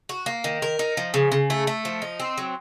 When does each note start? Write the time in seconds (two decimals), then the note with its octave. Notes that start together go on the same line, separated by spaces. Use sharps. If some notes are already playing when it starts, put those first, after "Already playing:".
0.09 F#4
0.26 A#3
0.44 D#3
0.62 A#4
0.79 D#4
0.97 F3
1.14 C#3
1.32 C#3
1.50 A3
1.67 A3
1.85 F3
2.02 D#4
2.20 C4
2.38 F#3